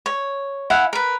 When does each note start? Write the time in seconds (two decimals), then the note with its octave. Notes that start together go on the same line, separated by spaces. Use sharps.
0.06 C#5
0.70 E4 F5 F#5 G#5
0.93 A#4 B4